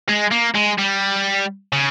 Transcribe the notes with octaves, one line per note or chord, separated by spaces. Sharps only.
G#3
A#3
G#3
G3
C#3